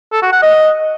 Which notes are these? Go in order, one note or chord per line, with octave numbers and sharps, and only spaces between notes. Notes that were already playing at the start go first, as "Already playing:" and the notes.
A4
F#4
F#5
D#5